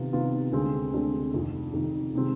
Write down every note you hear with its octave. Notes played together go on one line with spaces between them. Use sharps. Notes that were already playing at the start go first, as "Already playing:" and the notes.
Already playing: C3 D#3 B3 F4
C3 D#3 B3 F4
D2 D3 G#3 C4
D2 D3 G#3 C4
F1 F2 D#3
F1 F2 D#3
C3 D#3 G#3 C4